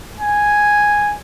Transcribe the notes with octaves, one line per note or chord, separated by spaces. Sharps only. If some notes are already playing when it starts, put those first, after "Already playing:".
G#5